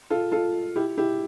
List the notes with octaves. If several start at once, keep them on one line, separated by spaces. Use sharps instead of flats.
F4 A4
F4 A4
E4 G4
E4 G4